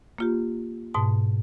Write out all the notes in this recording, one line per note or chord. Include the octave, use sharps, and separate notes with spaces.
A#3 F4 G4
G#2 B2 A5